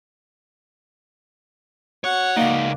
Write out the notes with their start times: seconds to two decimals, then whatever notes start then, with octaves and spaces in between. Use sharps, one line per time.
2.04 F#4 C#5 F#5
2.36 C#2 A#3 D#4 D5 F5